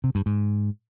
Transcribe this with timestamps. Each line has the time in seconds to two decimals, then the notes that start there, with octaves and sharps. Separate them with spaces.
0.04 C3
0.15 G2
0.26 G#2